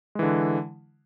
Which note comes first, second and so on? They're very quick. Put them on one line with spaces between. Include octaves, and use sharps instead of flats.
G#3 E3 D3